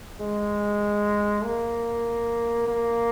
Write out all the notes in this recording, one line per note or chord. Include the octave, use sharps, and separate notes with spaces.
G#3
A#3
A#3